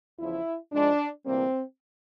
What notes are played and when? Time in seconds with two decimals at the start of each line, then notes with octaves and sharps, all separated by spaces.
0.20 E2 C#3 F3 E4
0.72 G#2 F3 G#3 D4
1.25 D2 C3 E3 G3 A#3 C4